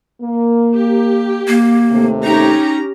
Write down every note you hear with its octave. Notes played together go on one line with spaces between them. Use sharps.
A#3
G4
A#3
D#2 C3 A3
C#4 D#4 G4 A#5